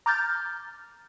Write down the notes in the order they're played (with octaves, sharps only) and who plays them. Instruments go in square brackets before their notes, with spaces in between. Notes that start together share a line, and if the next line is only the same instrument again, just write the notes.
[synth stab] A#5 D6 F6 G6 A6